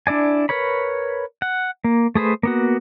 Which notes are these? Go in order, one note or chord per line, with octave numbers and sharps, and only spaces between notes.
D4 E4 D5 G#5
A#4 B4 C#5 B5
F#5
A#3
A3 G#4 B4 C5
A#3 B3 F#4